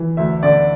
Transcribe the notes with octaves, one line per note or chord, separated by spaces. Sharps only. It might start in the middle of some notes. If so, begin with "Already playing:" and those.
Already playing: E3
D2 E5
D3 D5